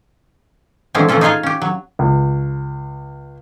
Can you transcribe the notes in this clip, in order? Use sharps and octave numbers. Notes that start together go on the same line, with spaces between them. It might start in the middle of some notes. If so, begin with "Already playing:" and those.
D3 E3 F3 G#3 C4 C#4
E3 A3 C#4 F4 A4
D#4 F4 G#4 D#5 F5 G#5
C#4 G4
F#3
C#2